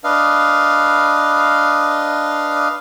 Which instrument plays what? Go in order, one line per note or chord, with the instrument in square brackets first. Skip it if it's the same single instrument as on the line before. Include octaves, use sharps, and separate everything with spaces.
[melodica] D4 B4 D#5 F5